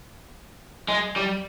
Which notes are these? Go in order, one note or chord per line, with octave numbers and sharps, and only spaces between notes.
G#3
G3